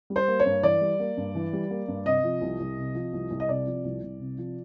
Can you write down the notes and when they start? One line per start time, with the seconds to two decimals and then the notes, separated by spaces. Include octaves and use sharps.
0.10 G3
0.16 C5
0.28 A#3
0.40 C#5
0.46 G2
0.63 E3 D5
0.81 G3
1.00 A#3
1.17 G2
1.35 E3
1.53 G3
1.70 A#3
1.88 G2
2.06 C3 D#5
2.24 F3
2.41 C2
2.60 C2
2.78 C3
2.95 F3
3.13 C2
3.31 C2
3.40 D#5
3.49 C3 D5
3.67 F3
3.84 C2
4.02 C2
4.20 C3
4.38 F3